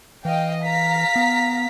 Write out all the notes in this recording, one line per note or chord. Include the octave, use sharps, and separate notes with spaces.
E3 D#5 F5 G5
F5 A#5 B6
B3